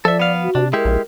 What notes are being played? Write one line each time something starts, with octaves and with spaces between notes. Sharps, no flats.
F3 A4 D5 E5
B3 F5
F#4
C3 D4
G#3 E4 G4 A#4
A#1